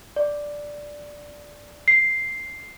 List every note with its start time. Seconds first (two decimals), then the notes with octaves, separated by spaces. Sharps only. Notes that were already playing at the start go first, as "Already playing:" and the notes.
0.16 D5
1.88 C7